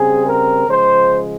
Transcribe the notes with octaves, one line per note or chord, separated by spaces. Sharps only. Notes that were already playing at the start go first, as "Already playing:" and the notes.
Already playing: C#3 G3 C4 G#4
A#4
C#3 F3 G#3 C5